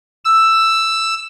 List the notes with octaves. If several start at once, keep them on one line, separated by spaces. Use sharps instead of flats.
E6